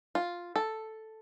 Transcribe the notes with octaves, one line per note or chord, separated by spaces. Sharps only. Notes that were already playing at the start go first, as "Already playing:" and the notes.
F4
A4